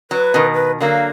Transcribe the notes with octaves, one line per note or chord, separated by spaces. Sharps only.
F#3 B4
B2 D#3
B4
D3 F#3 A#3 F5